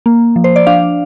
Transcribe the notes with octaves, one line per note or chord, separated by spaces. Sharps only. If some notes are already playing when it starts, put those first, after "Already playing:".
A#3
F3
C5
D5
D4 F5